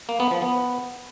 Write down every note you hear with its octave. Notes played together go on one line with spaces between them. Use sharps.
A#3
B3
F3
B3